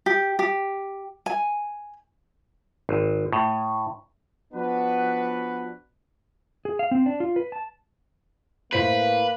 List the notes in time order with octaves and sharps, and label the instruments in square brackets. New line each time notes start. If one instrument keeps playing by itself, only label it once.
[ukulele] G4
G4
G#5
[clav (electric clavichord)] G#1
A2
[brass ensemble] F3 B3 D4 F#4 B4
[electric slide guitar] G#4
F5
C4
D4
F4
B4
A5
[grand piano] A2 C5 B6 [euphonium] A#3 [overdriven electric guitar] B4